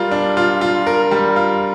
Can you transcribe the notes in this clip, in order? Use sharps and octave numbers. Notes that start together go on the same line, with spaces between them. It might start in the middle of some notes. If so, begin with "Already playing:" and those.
Already playing: G3 F4 A#4
D4
F4
F4
A#4
G3
F4